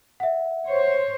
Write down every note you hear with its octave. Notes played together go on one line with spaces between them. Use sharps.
E5 F#5
C5 C#5